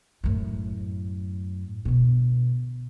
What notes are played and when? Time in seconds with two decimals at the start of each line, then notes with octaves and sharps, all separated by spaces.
0.24 F#2 A2
1.85 B2 D3